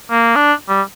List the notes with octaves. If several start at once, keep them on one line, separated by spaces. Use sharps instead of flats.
A#3
D4
G3